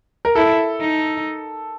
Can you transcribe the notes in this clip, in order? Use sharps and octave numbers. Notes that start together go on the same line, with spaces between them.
A#4
E4 A4
D#4